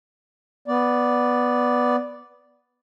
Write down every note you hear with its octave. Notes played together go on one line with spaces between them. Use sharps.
B3 D5